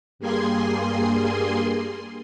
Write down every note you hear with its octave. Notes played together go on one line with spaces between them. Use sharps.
G2 G3 A#3 G#4 G#5 C6